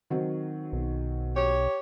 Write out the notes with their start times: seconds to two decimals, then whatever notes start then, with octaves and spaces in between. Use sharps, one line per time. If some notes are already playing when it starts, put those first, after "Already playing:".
0.10 D#3 F#3 C4
0.72 B1
1.36 G4 C#5